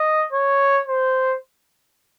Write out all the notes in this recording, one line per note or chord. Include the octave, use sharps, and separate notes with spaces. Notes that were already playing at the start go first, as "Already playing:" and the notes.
Already playing: D#5
C#5
C5